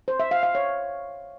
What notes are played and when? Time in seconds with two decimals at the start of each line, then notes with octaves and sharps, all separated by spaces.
0.08 C5
0.20 E5
0.31 F5
0.43 F5
0.55 C#5